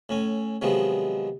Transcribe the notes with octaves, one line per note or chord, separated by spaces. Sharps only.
A2 C#4 G#5
C3 D#3 F3 F#3 G#3 B3